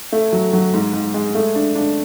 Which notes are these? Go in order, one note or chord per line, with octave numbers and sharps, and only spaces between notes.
A3
F#3
F#3
G#2
G#2
G#3
A3
D4
D4